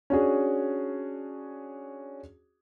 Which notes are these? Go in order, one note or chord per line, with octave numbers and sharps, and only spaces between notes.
C#4 D4 F#4 G#4